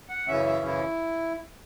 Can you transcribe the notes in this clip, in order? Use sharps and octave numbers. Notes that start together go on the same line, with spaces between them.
F#5
F#2 C#3 E3 C#4 E5
E5
E4